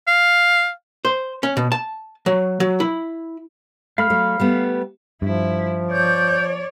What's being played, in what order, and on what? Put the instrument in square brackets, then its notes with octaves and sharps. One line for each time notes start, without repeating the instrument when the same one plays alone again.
[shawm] F5
[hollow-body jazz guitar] C5
C#4
B2
A5
F#3
F#3
E4
[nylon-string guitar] A3 [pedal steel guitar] F5 B5 F6
[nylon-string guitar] F#3 A3
G3 A3 B3
[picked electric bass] G2 [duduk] F3 [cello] E4
[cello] C#5 D5 [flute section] G6